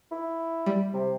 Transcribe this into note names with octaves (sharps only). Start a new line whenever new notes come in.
E4
G3
C3